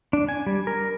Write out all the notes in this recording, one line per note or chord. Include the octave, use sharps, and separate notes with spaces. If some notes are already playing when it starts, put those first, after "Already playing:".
D4
G#5
G3
A#4